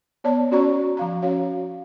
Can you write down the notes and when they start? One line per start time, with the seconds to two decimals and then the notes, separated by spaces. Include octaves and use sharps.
0.24 B3 C#5 D5 A5
0.51 C#4 F#4 C#5 D5 A#5 C#6
0.97 F3 F5 A#5
1.22 C#4 F#4 C#5 F5